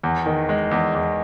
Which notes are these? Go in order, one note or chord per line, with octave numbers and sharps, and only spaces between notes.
E2
D#3
G#3
E2
E2